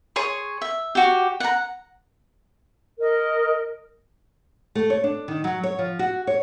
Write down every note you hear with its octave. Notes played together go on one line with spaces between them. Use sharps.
G#4 C#5 C6
E5
F#4 G4
F#5 A#5
A#4 D#5
A3
C#5
D4
D#3
F#3
C#5
F3
F#4
C#5